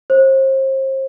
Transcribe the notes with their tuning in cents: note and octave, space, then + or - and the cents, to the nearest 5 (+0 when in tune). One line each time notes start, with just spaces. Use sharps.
C5 +35